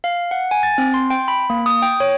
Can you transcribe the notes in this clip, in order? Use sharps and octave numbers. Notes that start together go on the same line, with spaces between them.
F5
F#5
G#5
A6
C4
C6
G5
B5
A#3
D#6
G5
C#5